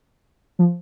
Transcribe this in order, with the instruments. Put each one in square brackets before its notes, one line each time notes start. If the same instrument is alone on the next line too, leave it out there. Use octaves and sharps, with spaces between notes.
[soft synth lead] F3